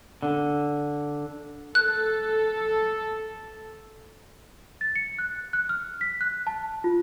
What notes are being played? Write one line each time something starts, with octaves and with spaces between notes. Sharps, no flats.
D3
A4 F#6
A6
C#7
F#6
F#6
F6
B6
F#6
A5
F4